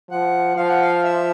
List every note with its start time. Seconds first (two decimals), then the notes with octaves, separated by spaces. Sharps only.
0.11 F3 F#5
0.56 F3 F5
0.68 F#5
0.81 F5
1.04 E5